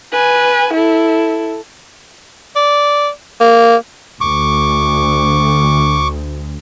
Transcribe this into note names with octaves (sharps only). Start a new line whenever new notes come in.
B4 G#5
E4 A4
D5
A#3
D2 C#6 D6